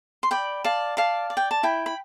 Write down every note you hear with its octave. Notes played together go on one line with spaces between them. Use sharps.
C6
D5 G5 B5
D5 F5 A5
D5 F5 A5
D5
G5
A5
E4 G5 B5
B5